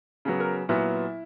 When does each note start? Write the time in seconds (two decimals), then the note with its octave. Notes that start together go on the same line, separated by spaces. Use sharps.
0.25 C#3 F#3 B3
0.40 A#4
0.69 A#2 F#3 B3 E4